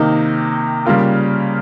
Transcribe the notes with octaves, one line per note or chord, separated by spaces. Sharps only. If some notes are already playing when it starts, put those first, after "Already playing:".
Already playing: C3 D#3 A#3 D#4
C#3 G3 A#3 F4 A#4